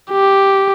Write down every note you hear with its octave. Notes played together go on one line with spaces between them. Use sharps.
G4